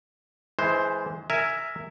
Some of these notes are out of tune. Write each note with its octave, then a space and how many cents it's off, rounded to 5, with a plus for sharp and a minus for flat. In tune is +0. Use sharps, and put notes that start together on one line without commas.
E3 +0 G#3 +25 C5 +0
A#4 -15 E5 +0 G#5 +0